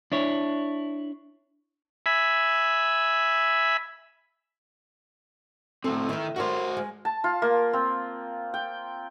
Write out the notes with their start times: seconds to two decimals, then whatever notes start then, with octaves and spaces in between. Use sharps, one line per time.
0.12 D4 E4 C#5
2.06 E5 G#5 B5
5.84 A2 C4 A4
6.09 D#3 E4 B4
6.36 G3 F#4 A#4 C5 C#5
6.77 G#3
7.05 A5
7.24 F4
7.42 A#3
7.73 C4
8.54 G5